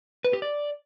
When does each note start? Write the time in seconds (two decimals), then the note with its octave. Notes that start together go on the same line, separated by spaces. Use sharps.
0.24 B4
0.33 G4
0.42 D5